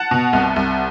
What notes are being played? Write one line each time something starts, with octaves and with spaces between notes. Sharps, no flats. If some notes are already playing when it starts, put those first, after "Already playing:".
Already playing: F#5 A5
B2
C2
C2